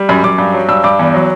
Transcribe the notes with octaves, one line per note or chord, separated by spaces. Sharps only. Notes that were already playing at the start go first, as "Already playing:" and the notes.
Already playing: G3
F#2 B5
F#2 D6
G2
F#3
G2 E6
G2 D6
E2
F#3